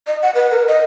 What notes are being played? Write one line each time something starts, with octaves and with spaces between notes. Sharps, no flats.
D#5
F#5
B4
A#4
D#5